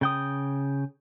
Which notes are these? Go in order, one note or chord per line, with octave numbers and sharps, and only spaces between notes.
C#3 G5 D#6